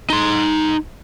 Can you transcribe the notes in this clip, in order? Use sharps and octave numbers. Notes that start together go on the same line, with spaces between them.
D#4 C6